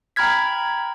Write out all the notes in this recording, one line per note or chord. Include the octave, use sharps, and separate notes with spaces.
G5 A#5 B5 F6 G#6 B6